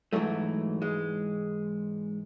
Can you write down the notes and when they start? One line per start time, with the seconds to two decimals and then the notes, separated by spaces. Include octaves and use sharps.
0.13 G#2 E3 F#3 A3
0.82 G#3